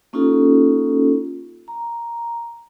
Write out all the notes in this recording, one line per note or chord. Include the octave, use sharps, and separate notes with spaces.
A#3 C#4 D#4 F4 G4 A4
A#5